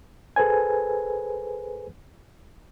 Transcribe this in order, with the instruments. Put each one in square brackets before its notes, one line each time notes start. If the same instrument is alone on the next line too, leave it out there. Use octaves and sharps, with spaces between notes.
[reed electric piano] G#4 A4 B4 C5 G#5